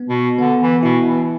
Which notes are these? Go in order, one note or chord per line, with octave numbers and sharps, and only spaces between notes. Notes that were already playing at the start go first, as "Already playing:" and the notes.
Already playing: B3
B2
D3 B3
E3
B2 E4
E3